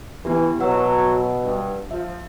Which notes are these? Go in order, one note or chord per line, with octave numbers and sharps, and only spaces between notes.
E3 B3 E4 G4
B2 F#3 B4 F#5 E6
G2
F3 E5